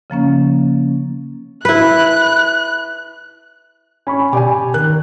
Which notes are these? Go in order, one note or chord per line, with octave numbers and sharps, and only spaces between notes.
C#3 F3 A#3 C#4
E4 B4 F#6
C#4 G#5 B5 C#6
B2 G4 D5 G#5
D#3 A#4 F#6